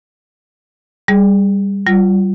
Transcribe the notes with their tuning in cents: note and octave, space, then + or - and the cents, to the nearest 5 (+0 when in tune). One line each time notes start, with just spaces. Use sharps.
G3 +15 G#4 +0
G3 -30 F4 +5